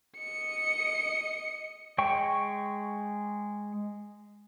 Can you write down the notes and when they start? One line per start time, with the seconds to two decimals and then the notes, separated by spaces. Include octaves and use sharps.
0.19 D#5 C#7
1.98 G#3 G5 C#6